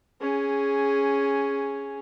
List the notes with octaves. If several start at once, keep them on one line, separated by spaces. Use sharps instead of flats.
C#4 G#4